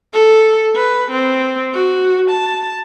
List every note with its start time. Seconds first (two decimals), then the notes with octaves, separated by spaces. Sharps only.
0.13 A4
0.76 B4
1.11 C4
1.74 F#4
2.31 A5